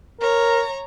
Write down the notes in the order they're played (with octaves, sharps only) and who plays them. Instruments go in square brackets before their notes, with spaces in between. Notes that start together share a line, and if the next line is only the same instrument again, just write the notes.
[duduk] A#4 [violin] C#5 A#5